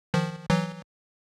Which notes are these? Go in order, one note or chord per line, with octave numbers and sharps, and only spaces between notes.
D#3 F3
E3 F#3